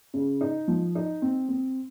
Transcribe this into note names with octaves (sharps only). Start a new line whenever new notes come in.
C#3
D#4
F3
D#4
C4
C4